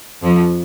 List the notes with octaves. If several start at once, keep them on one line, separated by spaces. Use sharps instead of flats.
F2 F3